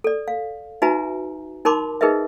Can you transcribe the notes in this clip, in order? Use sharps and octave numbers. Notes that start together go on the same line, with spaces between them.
A4 D5
F5
D#4 F#4 B4 E5 G#5 A#5
D#4 A#4 A5 B5 C6 D6
D#4 G#4 A#4 B4 D#5 E5